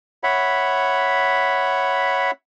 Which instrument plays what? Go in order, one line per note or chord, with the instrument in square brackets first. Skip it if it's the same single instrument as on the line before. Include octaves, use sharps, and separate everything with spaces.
[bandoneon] C#5 E5 F#5 B5